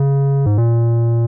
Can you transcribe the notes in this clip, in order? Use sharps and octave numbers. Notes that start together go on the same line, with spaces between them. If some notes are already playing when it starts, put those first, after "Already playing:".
Already playing: C#3
G#2
A#2